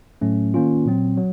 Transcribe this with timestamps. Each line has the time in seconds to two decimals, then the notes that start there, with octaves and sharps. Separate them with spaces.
0.22 A2 F#3 A3 C#4
0.54 D#3 A#3 C#4 F4
0.86 A#2 F#3 C4
1.18 F#3